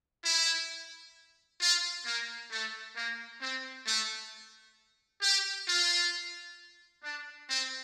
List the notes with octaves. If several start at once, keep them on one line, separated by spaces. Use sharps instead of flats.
E4
F4
A#3
A3
A#3
C4
A3
G4
F4
D4
C4